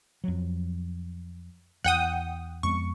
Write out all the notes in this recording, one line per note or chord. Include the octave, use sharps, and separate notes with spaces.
F2 F#3
E2 F#5 G5 D#6
F2 G#3 B3 C#6